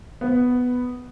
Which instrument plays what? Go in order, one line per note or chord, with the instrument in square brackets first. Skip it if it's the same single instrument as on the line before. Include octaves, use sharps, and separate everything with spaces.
[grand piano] B3 B4